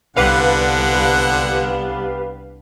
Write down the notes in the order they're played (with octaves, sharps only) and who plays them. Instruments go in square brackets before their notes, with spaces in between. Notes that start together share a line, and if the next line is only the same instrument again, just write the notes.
[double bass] C2 [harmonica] D3 F#5 [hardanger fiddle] B3 D4 [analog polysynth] G4 B4 F5